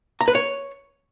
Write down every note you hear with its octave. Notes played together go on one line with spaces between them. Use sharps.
A#5
B4
C#5